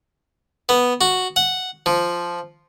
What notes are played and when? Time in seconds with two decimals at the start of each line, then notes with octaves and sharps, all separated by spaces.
0.69 B3
1.01 F#4
1.36 F#5
1.86 F3